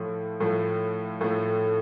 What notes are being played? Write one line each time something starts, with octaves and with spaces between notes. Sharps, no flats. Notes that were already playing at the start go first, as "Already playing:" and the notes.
Already playing: A2 F3 A3
A2 F3 A3
A2 F3 A3